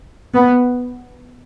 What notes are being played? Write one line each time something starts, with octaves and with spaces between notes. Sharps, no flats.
B3